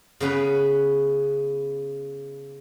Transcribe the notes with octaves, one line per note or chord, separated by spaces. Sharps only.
C#3 B3 C#4 B4